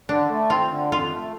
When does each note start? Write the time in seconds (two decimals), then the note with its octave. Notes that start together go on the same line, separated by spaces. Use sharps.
0.09 D3 D4
0.30 A3
0.50 C4 F4
0.71 D3
0.91 F2 F4
1.12 A3